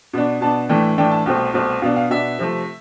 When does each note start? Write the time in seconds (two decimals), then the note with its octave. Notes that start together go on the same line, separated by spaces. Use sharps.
0.13 B2 B3 D4
0.41 B2 B3 D4 A5
0.69 A2 E3 A3 D4 G5
0.98 A2 E3 A3 D4 G5
1.11 A5
1.26 C2 B2 A3 C4 G5
1.54 C2 B2 A3 C4
1.82 B2 B3 D4 F5
1.96 F5
2.10 B2 B3 D4 E5
2.39 C3 F3 A3